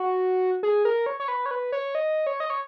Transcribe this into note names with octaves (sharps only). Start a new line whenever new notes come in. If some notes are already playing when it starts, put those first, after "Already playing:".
Already playing: F#4
G#4
A#4
C#5
C#5
B4
C#5
B4
C#5
D#5
C#5
D#5
C#5